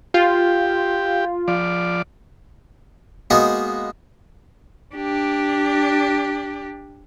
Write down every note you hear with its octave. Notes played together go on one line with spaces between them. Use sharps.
F4 G4
F3 D5
G#3 A#3 B3 D#4 F#4
D4 G4